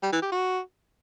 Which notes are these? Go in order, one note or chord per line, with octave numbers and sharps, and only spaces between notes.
G3
E3
G4
F#4